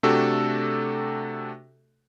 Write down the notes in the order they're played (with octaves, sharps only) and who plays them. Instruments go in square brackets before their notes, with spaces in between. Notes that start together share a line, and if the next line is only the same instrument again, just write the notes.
[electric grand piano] C3 A3 D4 F#4 G4 A4